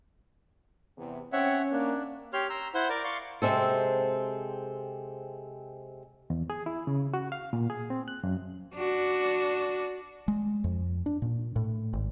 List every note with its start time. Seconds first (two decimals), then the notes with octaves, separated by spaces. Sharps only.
0.97 E2 C3
1.33 C4 C#4 C#5 E5 F#5
1.72 A#3 D4
2.33 G4 C#5 C6 F6
2.50 A#5 C6 E6
2.74 E4 C5 F#5 G6
2.89 A#4 D5
3.04 D5 F5 C6 C#6
3.42 C3 G#3 C4 A4
6.30 E2
6.50 G#4
6.66 E4
6.87 C#3
7.14 F#4
7.32 F5
7.53 A#2
7.70 G#4
7.90 C4
8.08 F#6
8.24 F#2
8.75 D4 F#4
10.28 G#3
10.64 F2
11.06 D4
11.22 A#2
11.56 A2
11.93 G#1